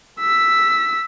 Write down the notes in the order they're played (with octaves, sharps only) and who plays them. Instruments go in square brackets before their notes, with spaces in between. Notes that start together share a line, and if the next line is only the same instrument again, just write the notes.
[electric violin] E6 B6